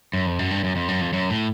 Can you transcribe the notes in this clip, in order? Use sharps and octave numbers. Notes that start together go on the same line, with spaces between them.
F#2
F2
F#2
G2
F#2
F2
F#2
F2
F#2
A2